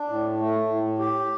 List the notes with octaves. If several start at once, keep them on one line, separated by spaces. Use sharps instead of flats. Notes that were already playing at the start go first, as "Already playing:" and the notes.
Already playing: D4
A2
A3
A2
G4